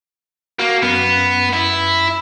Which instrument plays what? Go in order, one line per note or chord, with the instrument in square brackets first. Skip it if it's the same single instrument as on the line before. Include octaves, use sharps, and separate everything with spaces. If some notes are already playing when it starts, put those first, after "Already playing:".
[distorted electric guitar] A#3 [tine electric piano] F#4
[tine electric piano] F#2 [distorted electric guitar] B3
[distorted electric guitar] E4